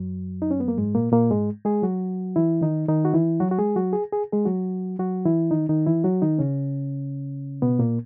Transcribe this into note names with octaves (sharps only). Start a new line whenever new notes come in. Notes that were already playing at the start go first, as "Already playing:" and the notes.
Already playing: F#2 F#3
D#4
C#4
B3
A#3
G#2 G#3
A#2 A#3
A#2 A#3
G#2 G#3
G#3 G#4
F#3 F#4
E3 E4
D#3 D#4
D#3 D#4
F#4
E3 E4
F#3 F#4
F#4
G#3 G#4
F#3 F#4
G#4
G#4
G#3 G#4
F#3 F#4
F#3 F#4
E3 E4
D#3 D#4
D#3 D#4
E3 E4
F#3 F#4
D#3 D#4
C#3 C#4
B2 B3
A#2 A#3